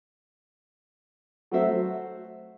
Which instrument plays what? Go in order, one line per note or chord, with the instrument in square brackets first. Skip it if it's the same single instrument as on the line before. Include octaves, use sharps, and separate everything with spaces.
[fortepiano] F#3 A3 C4 F#4 C5 E5